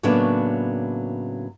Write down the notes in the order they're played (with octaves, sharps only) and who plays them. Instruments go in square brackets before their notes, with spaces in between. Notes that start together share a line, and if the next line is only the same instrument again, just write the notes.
[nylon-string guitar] A2 C#3 F#3 A#3 B3 D4